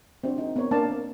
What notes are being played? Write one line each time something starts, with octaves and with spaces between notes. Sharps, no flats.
C4 D4 F#4
D#4
B3 C4 A#4 C#5
A#3 D4 D5 F5 A5
C4